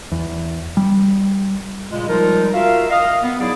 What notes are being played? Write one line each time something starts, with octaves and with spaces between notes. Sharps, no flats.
E2
G3
A#2 C#3 G#3
F3 G3 G#3 D#4 F4 A#4
F4 F#4 A#4 E5 F5
D#5 F5
B3
F#3 D#4 E4 G#4 D5